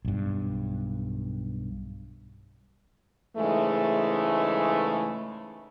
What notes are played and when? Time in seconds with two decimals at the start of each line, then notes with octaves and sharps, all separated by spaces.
0.05 B1 G2
3.37 G#2 C#3 E3 G#3 A3